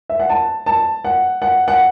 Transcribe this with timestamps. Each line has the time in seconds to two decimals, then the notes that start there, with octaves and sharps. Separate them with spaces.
0.10 E5
0.19 F#5
0.29 A5
0.66 A5
1.05 F#5
1.42 F#5
1.68 F#5